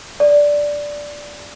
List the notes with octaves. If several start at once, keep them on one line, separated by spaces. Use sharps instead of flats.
D5